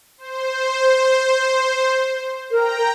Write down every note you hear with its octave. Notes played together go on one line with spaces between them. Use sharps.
C5
A#4 G5 A#5